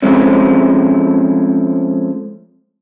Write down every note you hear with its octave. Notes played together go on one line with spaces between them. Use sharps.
F3 G#3 A3 C4 C#4